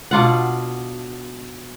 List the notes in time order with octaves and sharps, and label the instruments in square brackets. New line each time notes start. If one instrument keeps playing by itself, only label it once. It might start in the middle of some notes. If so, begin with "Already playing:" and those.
[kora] B2 D4 F4 F#5